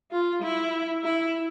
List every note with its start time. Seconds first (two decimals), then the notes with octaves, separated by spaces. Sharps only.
0.12 F4
0.42 E4
1.04 E4